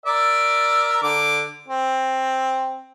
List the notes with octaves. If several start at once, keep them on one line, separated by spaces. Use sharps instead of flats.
A#4 D5 E5
D3 D6
C4